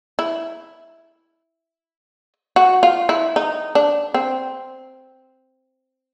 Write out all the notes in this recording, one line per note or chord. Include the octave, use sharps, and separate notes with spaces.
E4
F#4
F4
E4
D#4
D4
C4